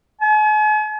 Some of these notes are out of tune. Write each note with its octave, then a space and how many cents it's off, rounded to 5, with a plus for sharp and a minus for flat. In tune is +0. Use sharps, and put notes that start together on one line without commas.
G#5 +45